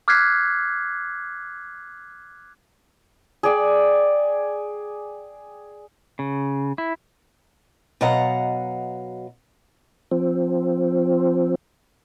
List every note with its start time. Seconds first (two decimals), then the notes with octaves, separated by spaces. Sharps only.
0.08 D6 F6 F#6 G#6 B6 C7
3.43 G#4 D5 G5
6.19 C#3
6.78 E4
8.01 B2 F#3 D#5 F5 F#5 A#5
10.11 F3 C4